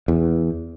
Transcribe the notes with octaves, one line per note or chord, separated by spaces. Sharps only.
E2